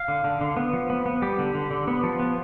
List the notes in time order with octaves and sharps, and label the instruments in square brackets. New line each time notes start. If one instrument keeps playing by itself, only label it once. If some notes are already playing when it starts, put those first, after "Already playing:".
Already playing: [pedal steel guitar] F5
D3
D3
D3
B3
F3
B3
B3
G3 G4
D3
D3
D3
B3
F3
B3